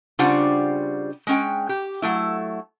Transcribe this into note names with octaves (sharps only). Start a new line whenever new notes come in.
C#3 G3 D4 F4 C5 F#5
G#3 C#4 G5
G4
F#3 A3 E4